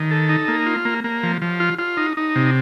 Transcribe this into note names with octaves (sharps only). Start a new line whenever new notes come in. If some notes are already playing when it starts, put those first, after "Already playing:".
Already playing: D#3
A4
D#4
A#3
F4
A#3
A#3
F3
F3
F4
F4
D#4
D#4
C3